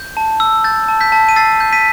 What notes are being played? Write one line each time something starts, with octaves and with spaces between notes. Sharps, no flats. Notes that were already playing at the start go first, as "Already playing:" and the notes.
Already playing: G6
A5
E6
G6 A6
A5
G6 B6
A5
D#7
E6 A6 C7
G6
B6 D#7